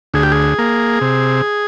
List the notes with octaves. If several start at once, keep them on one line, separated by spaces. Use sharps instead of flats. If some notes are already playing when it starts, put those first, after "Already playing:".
D2 G#4
G4
G#4
A#3
C3